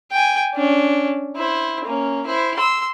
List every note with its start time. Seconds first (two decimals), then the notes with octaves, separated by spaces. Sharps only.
0.11 G5 G#5
0.55 C#4 D4
1.36 E4 C5
1.85 A#3 C#4
2.26 E4 C5
2.57 C6 E6